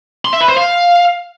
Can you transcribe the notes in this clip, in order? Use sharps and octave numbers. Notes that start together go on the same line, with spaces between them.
C6
E5
B4
C5
F5